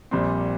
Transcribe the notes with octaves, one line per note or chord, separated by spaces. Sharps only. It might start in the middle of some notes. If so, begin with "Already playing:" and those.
A#1 A#2 G3 C4